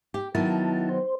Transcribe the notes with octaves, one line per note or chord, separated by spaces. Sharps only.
G4
D#3 F#3 B3 E4 A5
C5